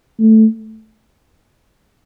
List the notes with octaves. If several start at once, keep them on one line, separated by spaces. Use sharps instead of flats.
A3